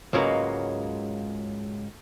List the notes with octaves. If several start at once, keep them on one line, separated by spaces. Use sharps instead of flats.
C#2 G#2 C#3 F#3 A#3 B3